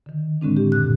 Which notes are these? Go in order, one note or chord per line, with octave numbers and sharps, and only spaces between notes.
D3 D#3
A2 D3 G#3 C4 D4
G4
F#2 A#2 F#6